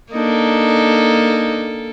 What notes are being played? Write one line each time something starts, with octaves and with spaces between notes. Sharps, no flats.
A#3 D4 D#4 A4